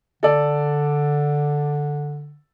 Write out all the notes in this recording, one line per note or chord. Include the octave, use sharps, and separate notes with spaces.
D3 A4 D5